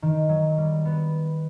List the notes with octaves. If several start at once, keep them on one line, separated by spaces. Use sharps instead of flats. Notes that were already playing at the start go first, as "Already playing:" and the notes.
D#3
F#3
G3
B3